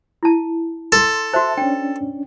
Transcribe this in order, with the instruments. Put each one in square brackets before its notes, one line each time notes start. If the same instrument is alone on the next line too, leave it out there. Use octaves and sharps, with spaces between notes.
[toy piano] E4 A5
[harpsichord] A4 [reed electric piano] C6
[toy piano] F#4 C5 [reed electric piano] E5 A5
[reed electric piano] C#4 D4 [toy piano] G5